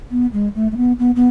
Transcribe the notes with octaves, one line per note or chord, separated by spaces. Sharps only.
B3
G#3
A3
A3
B3
B3
B3